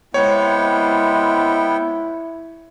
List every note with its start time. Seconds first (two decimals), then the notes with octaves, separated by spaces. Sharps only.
0.14 C3 G#3 B3 E4 C#5 G5